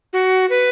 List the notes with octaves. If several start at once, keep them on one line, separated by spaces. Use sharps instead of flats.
F#4
B4